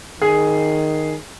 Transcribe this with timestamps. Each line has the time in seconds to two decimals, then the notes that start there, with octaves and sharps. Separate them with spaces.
0.22 D#3 G#4